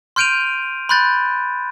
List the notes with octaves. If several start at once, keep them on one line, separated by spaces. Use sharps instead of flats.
C6 F6 G6 D7 D#7 F7
B5 C6 F#6 G6 A6